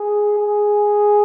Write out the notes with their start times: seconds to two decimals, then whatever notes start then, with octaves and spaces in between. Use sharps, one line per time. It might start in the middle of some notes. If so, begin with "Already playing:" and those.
Already playing: G#4
0.38 G#4